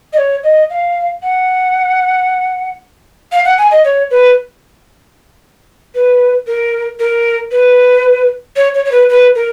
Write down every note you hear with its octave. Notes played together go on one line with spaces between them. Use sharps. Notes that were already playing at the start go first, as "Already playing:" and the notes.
D#5
C#5
D#5
F5
F#5
F5
F#5
G#5
D#5
C#5
B4
B4
A#4
A#4
B4
C#5
C#5
C#5
B4
B4
A#4